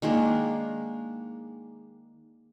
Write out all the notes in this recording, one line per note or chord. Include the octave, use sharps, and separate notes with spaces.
D#3 G#3 A#3 D4